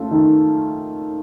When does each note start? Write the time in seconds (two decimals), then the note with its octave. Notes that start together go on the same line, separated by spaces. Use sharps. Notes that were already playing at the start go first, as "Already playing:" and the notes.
Already playing: A3 C#4 F4 A4
0.11 D#3